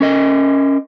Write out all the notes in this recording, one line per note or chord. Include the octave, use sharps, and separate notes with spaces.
C#4 A#4 D#5